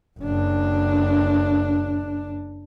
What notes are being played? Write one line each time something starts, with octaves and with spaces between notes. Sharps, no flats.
F#1 D4